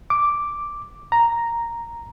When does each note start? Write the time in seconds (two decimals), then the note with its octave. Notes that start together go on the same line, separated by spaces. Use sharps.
0.10 D6
1.12 A#5